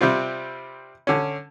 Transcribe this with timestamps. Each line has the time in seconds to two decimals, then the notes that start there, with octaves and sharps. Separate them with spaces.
0.01 C3 G3 C4 F4
1.07 D3 C#4